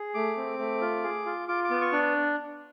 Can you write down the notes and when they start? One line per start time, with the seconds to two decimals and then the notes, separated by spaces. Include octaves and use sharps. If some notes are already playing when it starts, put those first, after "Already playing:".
Already playing: G#4
0.14 A3 D6
0.37 C4
0.59 A3
0.81 F4
1.04 G#4
1.26 F4
1.48 F4 D6
1.64 D6
1.70 B3
1.81 C#6
1.93 D4